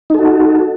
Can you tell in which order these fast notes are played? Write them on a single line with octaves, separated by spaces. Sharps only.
D#4 A4 F#4